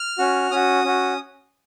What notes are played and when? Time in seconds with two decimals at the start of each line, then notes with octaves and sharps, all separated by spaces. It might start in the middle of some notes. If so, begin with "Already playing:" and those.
Already playing: F6
0.18 C#4 F#4
0.51 C#4 F#4 D#6
0.84 C#4 F#4